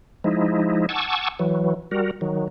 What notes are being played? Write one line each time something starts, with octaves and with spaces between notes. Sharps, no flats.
F3 G#3 D#4 E4
F#5 G#5 A5 C#6 D6 E6
E3 F#3
G3 F#4 A#4
D#3 F#3